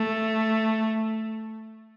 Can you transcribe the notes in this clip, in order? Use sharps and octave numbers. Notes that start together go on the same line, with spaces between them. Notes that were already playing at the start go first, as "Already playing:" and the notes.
Already playing: A3